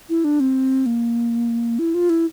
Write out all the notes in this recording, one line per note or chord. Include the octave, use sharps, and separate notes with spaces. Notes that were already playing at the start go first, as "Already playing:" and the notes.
E4
D4
C4
A#3
E4
F4
E4